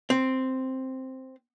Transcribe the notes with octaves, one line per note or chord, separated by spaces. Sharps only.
C4